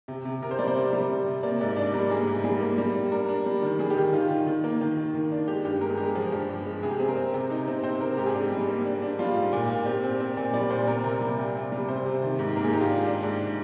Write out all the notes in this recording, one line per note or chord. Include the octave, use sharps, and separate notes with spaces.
C3
C3
C3 A#4
C5
G3 D5
C5
C3 A#4
G3
C3
C3
A#3 D5
G#2 D5
D4 D5
G3 A#4
A#3 G#4
G#2
G3 G#4
A#3
G3
G3
D4 A#4
D4
G3
D#3
G3 G#4
G4
D#3
D#3 F4
D#3
D#3
A#3
D#3
D#3
D#3
D4
G#3 G4
G2 G4
G#3 A#4
G#4
G#3 G4
G#4
F3
G2
G2
G#3
C3 G#4
G4
C4 G#4
A#4
C4
C3
D#4
C4
C4 C5
C4 A#4
G#2 G4
G#4
D4 G4
G3
A#3
D4
D4
G3 F4
G#2
A#2
A#2
C4 G4
C4
C4
A#2
G3 D5
A#2 C5
C4 A#4
C3 A#4
G3
C3
C3
G3
C3 C5
C3
D#3
G#2
A#3 A#4
G#4
G#2 G4
F4
D4
D4
G#2